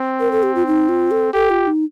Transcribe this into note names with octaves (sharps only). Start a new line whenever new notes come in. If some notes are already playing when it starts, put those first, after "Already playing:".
Already playing: C4
A#4
A4
G4
F4
D#4
F4
A4
G4 A4
F4
D#4